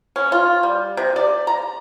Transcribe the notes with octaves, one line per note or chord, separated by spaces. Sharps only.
C#4
F4
G3
C3
D5
A#5